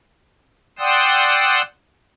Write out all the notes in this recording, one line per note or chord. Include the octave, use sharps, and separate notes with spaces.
D5 F#5 G5 C6 D#6 E6